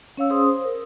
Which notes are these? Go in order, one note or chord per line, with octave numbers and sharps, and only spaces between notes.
C#4 C#5 F5 E6
C#4 G#4 C5 C6 D#6
C5
A#4